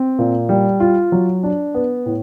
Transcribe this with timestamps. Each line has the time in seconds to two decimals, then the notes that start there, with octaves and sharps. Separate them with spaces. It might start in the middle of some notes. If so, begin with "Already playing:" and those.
Already playing: C4
0.19 A#2
0.49 G3
0.80 F4
1.12 F#3
1.43 D4
1.74 B3
2.06 A2